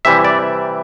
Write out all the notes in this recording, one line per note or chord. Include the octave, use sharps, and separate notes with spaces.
C3 E3 G3 E5
D5